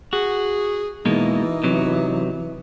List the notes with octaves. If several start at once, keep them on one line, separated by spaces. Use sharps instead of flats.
F#4 G#4
B2 E3 G#3 A#3 D#4
C3 F#3